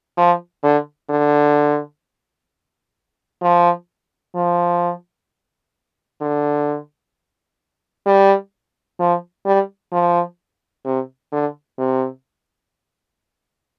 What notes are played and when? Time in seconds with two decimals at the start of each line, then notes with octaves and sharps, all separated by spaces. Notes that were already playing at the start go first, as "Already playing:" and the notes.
0.18 F3
0.63 D3
1.10 D3
3.42 F3
4.35 F3
6.21 D3
8.06 G3
9.00 F3
9.46 G3
9.92 F3
10.85 C3
11.32 D3
11.78 C3